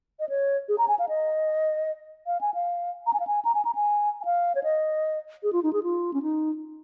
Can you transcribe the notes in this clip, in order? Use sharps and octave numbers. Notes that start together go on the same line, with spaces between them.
D#5
C#5
G#4
A#5
G#5
F5
D#5
F5
G#5
F5
A#5
G#5
F5
G#5
A#5
G#5
A#5
G#5
G#5
F5
C#5
D#5
G#4
F4
D#4
G#4
F4
C#4
D#4